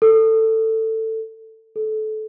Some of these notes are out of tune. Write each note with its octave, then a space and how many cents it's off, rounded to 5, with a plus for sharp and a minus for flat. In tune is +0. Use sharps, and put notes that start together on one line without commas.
A4 +15
A4 -25